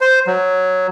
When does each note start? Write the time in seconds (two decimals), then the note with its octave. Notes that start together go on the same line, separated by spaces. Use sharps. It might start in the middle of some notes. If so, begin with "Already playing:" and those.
0.01 C5
0.27 F#3